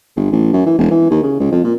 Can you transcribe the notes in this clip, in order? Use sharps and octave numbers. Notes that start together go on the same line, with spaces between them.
G1
A1
F#2
E3
E1
E3
D#2
C#3
C#2
F2
A#2